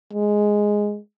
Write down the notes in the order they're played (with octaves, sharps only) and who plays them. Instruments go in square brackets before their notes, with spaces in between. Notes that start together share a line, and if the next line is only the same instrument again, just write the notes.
[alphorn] G#3